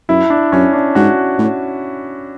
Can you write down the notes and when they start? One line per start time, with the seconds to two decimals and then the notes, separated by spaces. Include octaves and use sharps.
0.09 F#2 E4
0.30 D4
0.52 F#2 C#4
0.74 D4
0.95 G#2 F#4
1.38 A2